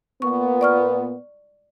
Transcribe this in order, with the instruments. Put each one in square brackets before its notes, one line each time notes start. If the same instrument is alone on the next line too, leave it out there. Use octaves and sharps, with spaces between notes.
[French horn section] A#2 B3 [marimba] C#6
[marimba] D5 C#6 F6